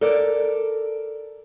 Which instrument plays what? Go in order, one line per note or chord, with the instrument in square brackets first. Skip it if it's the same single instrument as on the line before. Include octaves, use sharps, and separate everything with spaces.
[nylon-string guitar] A4 A#4 D5